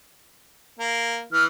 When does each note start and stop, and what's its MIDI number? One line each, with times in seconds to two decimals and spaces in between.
0.79 1.21 58
1.32 1.45 52
1.32 1.44 89